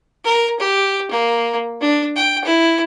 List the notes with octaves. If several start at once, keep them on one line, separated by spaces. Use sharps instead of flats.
A#4
G4
A#3
D4
G5
E4